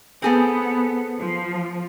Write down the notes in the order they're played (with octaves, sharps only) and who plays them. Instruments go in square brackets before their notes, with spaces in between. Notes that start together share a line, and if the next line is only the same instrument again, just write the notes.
[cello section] B3 [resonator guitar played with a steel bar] C4 G#4 A4
[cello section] F3